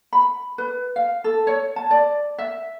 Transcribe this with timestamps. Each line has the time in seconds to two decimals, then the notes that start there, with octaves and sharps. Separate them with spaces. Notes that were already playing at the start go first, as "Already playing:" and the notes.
0.13 B5
0.58 B4
0.96 F5
1.24 A4
1.47 C#5
1.76 A5
1.91 D5
2.38 E5